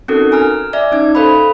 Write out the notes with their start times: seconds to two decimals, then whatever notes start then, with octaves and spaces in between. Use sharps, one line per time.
0.08 C4 C#4 D#4 F#4 A4 A#4
0.32 G#5 A#5 F6
0.73 D5 E5
0.92 C#4 D#4 G#6
1.15 A4 C5 F5 B5